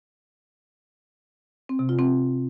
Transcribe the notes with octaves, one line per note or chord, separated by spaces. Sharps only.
C4
C3
F4
C4